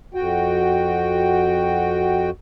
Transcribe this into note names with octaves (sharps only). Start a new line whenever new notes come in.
F2 F#4 G5